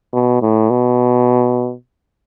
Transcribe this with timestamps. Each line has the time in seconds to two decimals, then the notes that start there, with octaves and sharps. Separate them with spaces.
0.13 B2
0.42 A2
0.70 B2